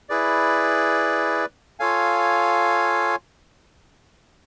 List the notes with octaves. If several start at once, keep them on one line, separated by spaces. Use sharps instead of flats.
E4 G#4 B4 D5
F4 A4 C#5 F5 G#5